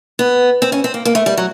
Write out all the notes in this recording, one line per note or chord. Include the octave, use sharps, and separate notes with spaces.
B3
C4
C#4
C4
A#3
A#3
A3
G3
F#3